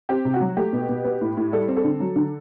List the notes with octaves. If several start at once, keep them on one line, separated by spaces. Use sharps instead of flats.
C4 G4
C3
F#4
F#3
A3 G4
B2
B2
B3
A2
A2
G3 A4
C4
A4
D3
F#3
D3